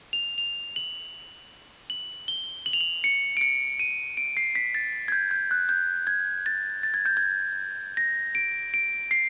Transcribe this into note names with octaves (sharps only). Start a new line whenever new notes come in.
F7
F7
F#7
F#7
G7
F#7
F7
F#7
C#7
D7
C#7
D#7
D7
C7
B6
A6
G#6
G6
G6
F#6
G6
G#6
A6
A6
G#6
G6
G#6
A#6
D7
D7
C7